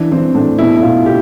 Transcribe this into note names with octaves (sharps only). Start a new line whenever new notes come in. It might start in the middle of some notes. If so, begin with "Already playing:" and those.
Already playing: E3 D4
E3 C4
A2 D4
B2 E4
E4
B2 F4
G4